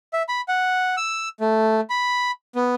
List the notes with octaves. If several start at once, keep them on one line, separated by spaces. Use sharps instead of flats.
E5
B5
F#5
E6
A3
B5
B3